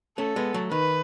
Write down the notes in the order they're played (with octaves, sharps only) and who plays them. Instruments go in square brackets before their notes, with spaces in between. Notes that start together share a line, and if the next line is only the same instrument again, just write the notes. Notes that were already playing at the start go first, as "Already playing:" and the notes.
[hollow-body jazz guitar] A3 C#4 [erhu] A4
[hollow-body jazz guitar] G#3 B3
F#3 A3
[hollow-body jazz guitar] D#3 [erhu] B4